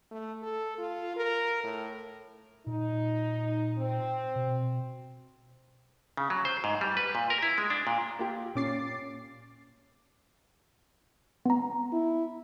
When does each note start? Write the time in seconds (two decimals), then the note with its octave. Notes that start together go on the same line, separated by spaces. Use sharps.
0.11 A3
0.42 A4
0.78 F4
1.17 A#4
1.64 A2
2.67 A#2 D#4
3.78 C4
4.36 B2
6.17 C#3
6.30 F#3
6.45 C5
6.64 G#2
6.81 G3
6.97 B4
7.15 A#2
7.30 A#4
7.43 E4
7.58 G#3
7.70 D4
7.87 A#2
8.19 A#3 F4 G4
8.55 A#2 C#4 D6 A6 C7
11.45 B3 A#5
11.93 E4